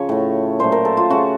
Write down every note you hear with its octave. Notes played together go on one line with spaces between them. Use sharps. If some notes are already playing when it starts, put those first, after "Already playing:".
Already playing: C#3 F3 C#5
A2 A3
A#2 F#3 A3 C5
A#4
A4
F4
C#3 A3 F#4